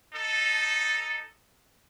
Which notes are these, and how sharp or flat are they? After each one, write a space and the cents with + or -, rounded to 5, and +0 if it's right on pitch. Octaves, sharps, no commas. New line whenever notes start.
D#4 +0 A4 +0